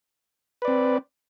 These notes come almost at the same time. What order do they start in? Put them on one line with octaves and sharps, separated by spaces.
B4 D5 C4